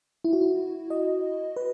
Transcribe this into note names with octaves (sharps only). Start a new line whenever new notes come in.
E4
F#4
E4
D#5
B4